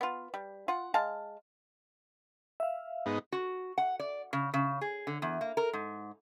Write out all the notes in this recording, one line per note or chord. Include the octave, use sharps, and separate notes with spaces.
B3 F4
G3
F4 F#5
G#3 F5 A5
E5 F5
G#2 B3 D#4
F#4
F#5
D5
C#3
C#3
G#4
D3
E2
A#3
A#4
G#2